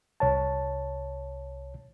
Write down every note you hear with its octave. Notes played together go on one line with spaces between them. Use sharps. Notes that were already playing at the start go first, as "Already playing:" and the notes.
C2 C#5 A5